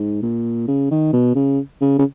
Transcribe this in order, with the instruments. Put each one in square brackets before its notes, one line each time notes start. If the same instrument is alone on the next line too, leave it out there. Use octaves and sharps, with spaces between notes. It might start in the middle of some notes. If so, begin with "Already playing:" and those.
Already playing: [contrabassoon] G#2
A#2
C#3
D#3
B2
C#3
C#3
C#3